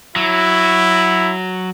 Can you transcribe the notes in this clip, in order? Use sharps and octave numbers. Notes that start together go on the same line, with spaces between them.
F#3 E4